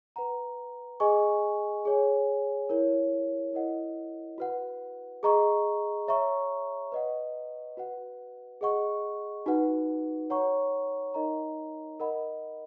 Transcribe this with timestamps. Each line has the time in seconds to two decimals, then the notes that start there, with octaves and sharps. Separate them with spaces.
0.16 B4 F#5 A#5
1.00 G#4 D#5 G#5 C#6
1.85 G#4 C#5 G#5
2.69 E4 A#4 C#5
3.54 E4 A#4 D#5 F#5
4.38 F#4 B4 F#5
5.23 G#4 D#5 A#5 C#6
6.08 C#5 E5 A#5 C#6
6.92 B4 D#5 F#5
7.77 F#4 B4 F#5
8.61 G#4 D#5 F#5 C#6
9.46 D#4 F#4 B4 F#5
10.30 C#5 F#5 A#5 C#6
11.14 D#4 A#4 D#5 A#5
12.00 A#4 D#5 F#5 B5